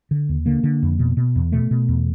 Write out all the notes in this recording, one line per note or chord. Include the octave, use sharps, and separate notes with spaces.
D3
D#2
D3 A#3
D3
F2
B2
B2
E2
B2 A3
B2
E2